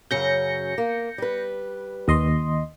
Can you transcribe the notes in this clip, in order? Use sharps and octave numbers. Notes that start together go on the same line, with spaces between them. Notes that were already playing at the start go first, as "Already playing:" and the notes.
F#2 C#3 F#3 G6 A#6 C#7
A#3
G3 B4
D#2 D#5 C6